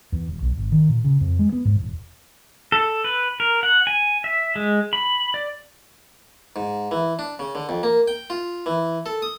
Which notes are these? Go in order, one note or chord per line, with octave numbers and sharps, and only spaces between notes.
E2
E1
B1
G#1
D#3
A#2
C#3
F2
G#3
B3
G#2
E1
A4
B4
A#4
F#5
G#5
E5
G#3
B5
D5
G#2
E3
D4
C#3
D3
F2
A#3
G5
F4
E3
A4
D#6